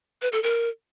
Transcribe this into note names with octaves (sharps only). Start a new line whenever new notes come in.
B4
A4
A#4